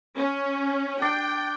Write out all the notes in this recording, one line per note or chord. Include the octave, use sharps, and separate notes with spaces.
C#4
D4 G5